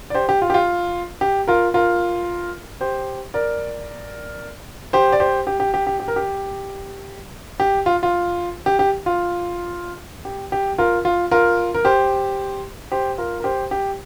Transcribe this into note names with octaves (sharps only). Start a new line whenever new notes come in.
D5
G4 C5
G4
F4
G4
F4
G4
F4 A#4
F4 A#4
G4 C5
A#4 D5
G4 C5
D5
G4 C5
G4
G4
G4
G4
G4
A#4
G4
G4
F4
F4
G4
G4
F4
G4
G4
F4 A#4
F4
F4 A#4
A#4
G4 C5
G4 C5
F4 A#4
A#4
G4 C5
G4